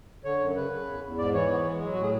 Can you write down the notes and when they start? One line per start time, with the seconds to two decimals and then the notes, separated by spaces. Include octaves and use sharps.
0.24 D3 C#5
0.40 F#2
0.56 C#3 B4
0.71 C#3
0.87 E2
1.03 E2
1.18 G#2 D5
1.34 E3 C#5
1.50 B3
1.65 G#3
1.82 F#3
1.93 A2 F#4
2.02 G#4